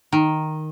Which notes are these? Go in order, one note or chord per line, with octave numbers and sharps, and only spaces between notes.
D#3